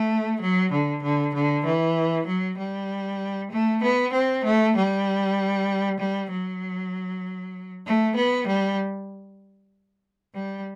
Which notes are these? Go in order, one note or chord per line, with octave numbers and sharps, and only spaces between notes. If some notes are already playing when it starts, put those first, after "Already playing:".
Already playing: A3
F#3
D3
D3
D3
E3
F#3
G3
A3
B3
C4
A3
G3
G3
F#3
A3
B3
G3
G3